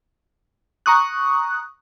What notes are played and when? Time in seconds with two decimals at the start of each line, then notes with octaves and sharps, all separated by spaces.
0.86 A#5 C#6 D#6 F#6